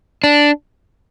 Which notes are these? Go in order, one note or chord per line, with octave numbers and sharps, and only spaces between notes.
D4